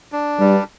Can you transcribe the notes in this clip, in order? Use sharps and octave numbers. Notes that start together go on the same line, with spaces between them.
D4
G2 G3